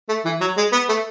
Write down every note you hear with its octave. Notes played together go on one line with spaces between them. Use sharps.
A3
E3
F#3
G#3
B3
A3